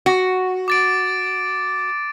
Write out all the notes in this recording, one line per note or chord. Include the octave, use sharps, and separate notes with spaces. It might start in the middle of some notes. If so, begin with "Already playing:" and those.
F#4
D6 A6 D7